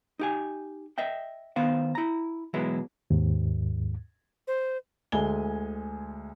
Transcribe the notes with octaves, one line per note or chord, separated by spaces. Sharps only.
D#4 G4 G#5
D#5 E5 G5
D#3 B3 C5 F5
E4 A#5
B2 E3 F#3 G#3 B3 E4
D#2 G#2
C5
D2 G#3 G#5 G7